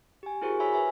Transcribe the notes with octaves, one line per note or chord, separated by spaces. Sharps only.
G4 G#5
E4 F#4 G#4 A#4 C5 C#6
C#5 E5 G#5 B5 E6 B6
B4 E5 G#5 B5